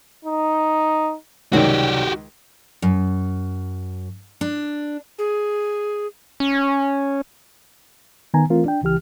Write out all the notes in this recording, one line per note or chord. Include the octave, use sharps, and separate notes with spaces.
D#4
C#2 C3 D#3 F#3 G3 F#4 G4
F#2
D4
G#4
C#4
D#3 B3 G#5 A#5
E3 A3 C4 F4 A#4
D4 G5
C#2 E3 G4 F6